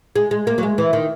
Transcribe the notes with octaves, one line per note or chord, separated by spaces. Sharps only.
G#3
G#3
A#3
F#3
G#3
E3
D#3